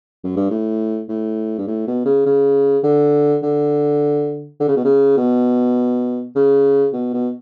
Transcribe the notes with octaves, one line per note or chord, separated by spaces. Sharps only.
F#2
G2
A2
A2
G2
A2
B2
C#3
C#3
D3
D3
D3
C#3
B2
C#3
B2
C#3
B2
B2